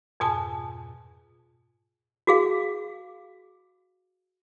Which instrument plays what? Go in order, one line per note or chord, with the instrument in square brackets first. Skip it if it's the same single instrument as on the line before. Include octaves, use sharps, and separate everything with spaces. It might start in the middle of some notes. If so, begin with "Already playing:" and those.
[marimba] F2 G#2 B2 G#5 A5
[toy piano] F#4 G#4 F5